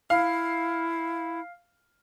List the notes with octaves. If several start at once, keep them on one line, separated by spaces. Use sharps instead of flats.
E4 F5